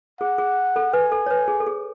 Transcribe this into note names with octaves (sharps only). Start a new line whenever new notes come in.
G#4 F#5
G#4
A4
B4 G#5
A4
C#5
B4
G#4
A4
G#4